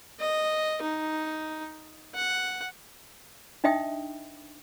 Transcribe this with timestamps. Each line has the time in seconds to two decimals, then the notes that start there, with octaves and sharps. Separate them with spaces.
0.20 D#5
0.82 D#4
2.14 F#5
3.64 D4 D#4 D#5 E5 G5 D#6